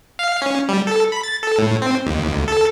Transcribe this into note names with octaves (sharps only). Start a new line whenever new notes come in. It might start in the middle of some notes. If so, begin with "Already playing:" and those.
F5
C#4
G3
A4
B5
A6
A4
A2
C4
D#2
D2
A4